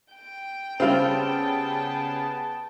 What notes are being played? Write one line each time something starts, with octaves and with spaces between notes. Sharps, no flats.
G5
C#3 G3 B3 C4 F4 G#4 A5